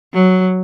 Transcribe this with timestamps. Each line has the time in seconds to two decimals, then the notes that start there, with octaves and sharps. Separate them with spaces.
0.14 F#3